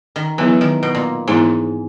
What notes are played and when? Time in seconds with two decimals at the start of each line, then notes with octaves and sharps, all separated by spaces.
0.16 D#3
0.38 E3 F#3 B3 E4 G#4
0.61 D#3
0.83 B2
0.95 A#2
1.27 G#2 E3 G#3 B3 E4